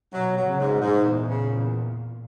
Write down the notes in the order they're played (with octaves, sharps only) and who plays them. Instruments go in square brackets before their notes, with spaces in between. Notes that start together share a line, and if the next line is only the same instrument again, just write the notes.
[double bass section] B2 [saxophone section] F#3
[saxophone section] F#3
[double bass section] C#3
[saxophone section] G#2
[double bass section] A#2
[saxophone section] G#2
E2
C#3
E2